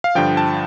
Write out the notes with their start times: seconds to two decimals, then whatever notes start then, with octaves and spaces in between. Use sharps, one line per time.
0.04 F5
0.15 G2 D3 F3 G5
0.37 A5